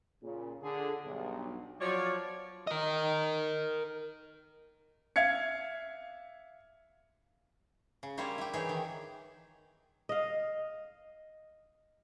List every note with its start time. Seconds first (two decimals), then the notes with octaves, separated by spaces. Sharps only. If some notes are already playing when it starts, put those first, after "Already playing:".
0.22 A#2 C#3
0.62 D3 G#4
1.05 B1 G2
1.80 F3 F#3 C#5 D5
2.67 A#4 D#5
5.16 E5 F5 G#6 C#7
8.03 C#3
8.17 G3 A#3 E4 C5 C#5
8.38 E4 G4
8.53 E3 D#4 G#4 C#5
8.69 D#3
10.09 D#5 F5